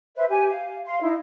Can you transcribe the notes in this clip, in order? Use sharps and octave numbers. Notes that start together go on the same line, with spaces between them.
B4 C5 E5
G4 G#5
F5
F5 C6
D#4 E4